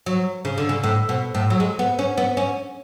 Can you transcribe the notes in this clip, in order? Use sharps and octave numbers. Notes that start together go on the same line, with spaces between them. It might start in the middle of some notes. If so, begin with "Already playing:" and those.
F#3
C#3
D3
C#3
A2
B2
A2
F#3
G#3
B3
C#4
B3
C#4